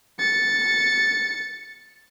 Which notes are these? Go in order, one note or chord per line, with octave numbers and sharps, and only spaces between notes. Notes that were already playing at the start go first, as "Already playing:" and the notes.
A6 C#7